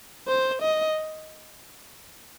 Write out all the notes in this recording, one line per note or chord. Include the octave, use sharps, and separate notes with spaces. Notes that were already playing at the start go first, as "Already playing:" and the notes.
C5
D#5